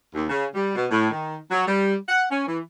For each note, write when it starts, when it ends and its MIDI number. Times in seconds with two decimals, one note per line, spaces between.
0.15 0.27 39
0.29 0.45 49
0.54 0.74 55
0.75 0.86 47
0.91 1.10 45
1.11 1.37 51
1.50 1.64 54
1.67 1.95 55
2.08 2.25 78
2.31 2.46 61
2.47 2.60 52